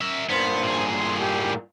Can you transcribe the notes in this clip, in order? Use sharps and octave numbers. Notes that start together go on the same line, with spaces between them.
A#4 E5
G2 A#2 B3 C5
A2 G#4
C6
G4